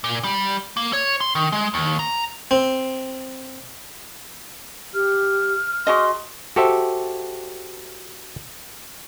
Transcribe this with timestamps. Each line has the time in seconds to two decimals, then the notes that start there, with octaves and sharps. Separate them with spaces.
0.04 A#2
0.24 G3
0.77 A#3
0.93 C#5
1.21 C6
1.35 D#3
1.52 G#3
1.74 D#2
1.99 A#5
2.51 C4
4.94 G4 F6
5.87 F#4 G#4 D#5 C6
6.56 F#4 G4 A4 C5 E5